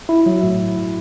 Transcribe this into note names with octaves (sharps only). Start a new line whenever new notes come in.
E4
F#3
A2